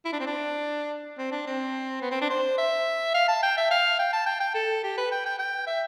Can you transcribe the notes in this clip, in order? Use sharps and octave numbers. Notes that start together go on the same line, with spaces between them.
E4
D4
C4
D4
C4
D4
C4
B3
C4
D4
C5
E5
F5
A5
G5
E5
F5
G5
A5
G5
G5
A4
G4
B4
G5
G5
G5
E5